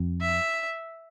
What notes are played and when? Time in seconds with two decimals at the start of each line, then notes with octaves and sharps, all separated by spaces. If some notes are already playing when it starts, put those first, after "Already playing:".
Already playing: F2
0.21 E5